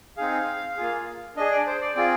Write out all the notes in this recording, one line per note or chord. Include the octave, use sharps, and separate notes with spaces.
C4 D#4 G#4 F5
A#3 F4 G#4
D4 G#4 D#5
D5
C5
D5
C4 F4 G#4 D5